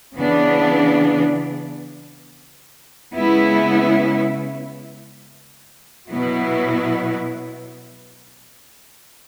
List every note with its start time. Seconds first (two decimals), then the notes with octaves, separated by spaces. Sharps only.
0.17 C#3 E3 B3 D4
3.14 C#3 G#3 B3 E4
6.11 B2 F#3 B3 E4